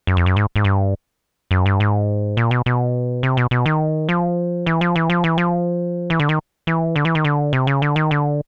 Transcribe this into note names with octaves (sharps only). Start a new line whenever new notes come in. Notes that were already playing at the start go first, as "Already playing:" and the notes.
F#2
F2
F#2
G#2
G#2
G2
F#2
G2
G#2
A#2
B2
B2
C3
B2
B2
D#3
F3
E3
F3
E3
F3
E3
F3
E3
D3
D#3
E3
D3
E3
D#3
D3
C3
C#3
D3
D#3
D3